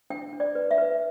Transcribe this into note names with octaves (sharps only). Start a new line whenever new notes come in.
D4 G5
D4
D5
B4
E5
B4